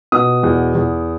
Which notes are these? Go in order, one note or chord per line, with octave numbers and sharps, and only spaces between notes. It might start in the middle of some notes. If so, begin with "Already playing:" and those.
B2 D#6
E2
E2